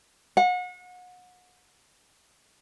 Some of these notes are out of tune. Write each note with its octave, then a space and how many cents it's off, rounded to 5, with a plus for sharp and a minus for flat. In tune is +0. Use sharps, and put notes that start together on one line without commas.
F#5 -35